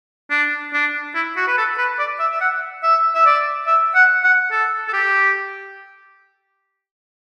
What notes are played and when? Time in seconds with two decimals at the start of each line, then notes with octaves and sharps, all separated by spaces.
0.31 D4
0.73 D4
1.15 E4
1.37 F#4
1.47 B4
1.58 A4
1.78 B4
1.99 D5
2.20 E5
2.32 E5
2.41 F#5
2.83 E5
3.15 E5
3.26 D5
3.67 E5
3.95 F#5
4.24 F#5
4.52 A4
4.88 A4
4.93 G4